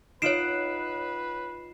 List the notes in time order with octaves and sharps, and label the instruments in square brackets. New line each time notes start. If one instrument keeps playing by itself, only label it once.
[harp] D#4 F4 F#5 [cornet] B4 [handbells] C#5 D7 [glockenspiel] C7 E7